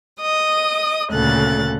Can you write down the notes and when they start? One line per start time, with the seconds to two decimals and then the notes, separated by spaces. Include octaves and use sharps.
0.19 D#5 D#6
1.11 D2 A#2 C#3 A4 F#6 A6